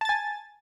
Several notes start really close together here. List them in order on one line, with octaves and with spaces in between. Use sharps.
A5 A6 G#5